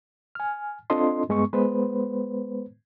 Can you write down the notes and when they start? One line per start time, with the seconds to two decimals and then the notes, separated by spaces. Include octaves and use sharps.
0.35 G#5 F6
0.90 C4 D4 F4 A4 D#5 C6
1.29 G2 G#3 B3 C#6
1.53 G#3 B3 B4 C5